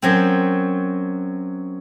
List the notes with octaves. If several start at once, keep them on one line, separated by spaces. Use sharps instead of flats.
F#2 F#3 C4